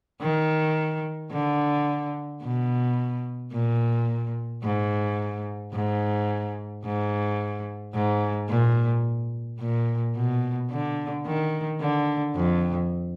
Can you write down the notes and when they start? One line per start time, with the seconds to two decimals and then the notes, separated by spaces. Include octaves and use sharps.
0.21 D#3
1.31 D3
2.42 B2
3.53 A#2
4.63 G#2
5.73 G#2
6.84 G#2
7.94 G#2
8.49 A#2
9.60 A#2
10.15 B2
10.71 D3
11.26 D#3
11.80 D3
12.35 F2